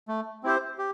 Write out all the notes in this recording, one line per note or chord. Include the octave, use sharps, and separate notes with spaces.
A3
C4 E4 G4 C5
G4